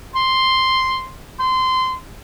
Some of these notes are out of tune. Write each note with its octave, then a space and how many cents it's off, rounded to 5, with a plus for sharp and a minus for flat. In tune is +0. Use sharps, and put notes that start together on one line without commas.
C6 +0
C6 -20